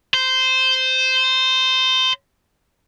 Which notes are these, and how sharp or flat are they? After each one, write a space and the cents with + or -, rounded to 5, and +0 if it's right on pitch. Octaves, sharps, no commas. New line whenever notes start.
C5 -10